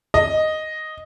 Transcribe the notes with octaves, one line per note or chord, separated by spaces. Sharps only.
D#5